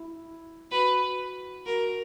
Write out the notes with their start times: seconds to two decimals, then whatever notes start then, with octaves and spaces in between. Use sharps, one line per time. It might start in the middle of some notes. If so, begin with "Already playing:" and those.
Already playing: E4
0.71 F#4 B4
1.66 F#4 A#4